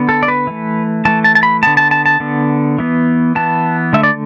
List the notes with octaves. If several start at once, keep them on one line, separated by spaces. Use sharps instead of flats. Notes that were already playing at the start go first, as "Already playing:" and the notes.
Already playing: D3 B3
A4
D5
B4
E3 A3
E3 A3 A5
A5
A5
B5
D3 B3 A5
A5
A5
A5
D3 B3
E3 B3
E3 B3 A5
D3 A3 E5
D5